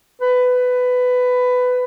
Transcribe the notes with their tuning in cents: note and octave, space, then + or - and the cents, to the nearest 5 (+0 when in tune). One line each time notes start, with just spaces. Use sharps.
B4 +15